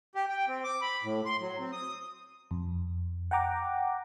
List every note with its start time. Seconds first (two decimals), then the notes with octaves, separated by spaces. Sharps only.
0.15 G4
0.28 G5
0.48 C4
0.64 D6
0.82 B5
1.03 A2
1.25 C6
1.40 F#3
1.59 C4
1.72 D#6
2.51 F2
3.31 F#5 G5 A#5 D6